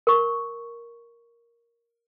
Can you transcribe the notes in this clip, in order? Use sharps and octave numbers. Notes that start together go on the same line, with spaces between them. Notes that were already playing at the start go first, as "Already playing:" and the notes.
A#4 C#6